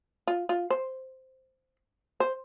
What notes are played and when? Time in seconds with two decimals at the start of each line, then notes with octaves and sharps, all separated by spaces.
0.27 F4
0.49 F4
0.70 C5
2.20 C5